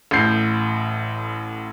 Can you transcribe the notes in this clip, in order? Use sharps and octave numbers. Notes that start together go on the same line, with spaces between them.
A1 A2 G6 C7